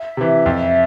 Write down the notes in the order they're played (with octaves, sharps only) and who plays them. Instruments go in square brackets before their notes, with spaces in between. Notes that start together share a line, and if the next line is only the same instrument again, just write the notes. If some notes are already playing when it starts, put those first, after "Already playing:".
Already playing: [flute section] E5
[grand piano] C3 E3
F2